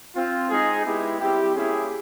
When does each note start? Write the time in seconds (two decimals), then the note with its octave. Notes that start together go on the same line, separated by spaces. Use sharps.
0.15 C4 F4
0.49 G#3 C4 D#4 G#4
0.85 G#3 B3 E4 G4 G#4
1.20 G3 C4 E4 G4
1.55 A#3 C#4 E4 G4 G#4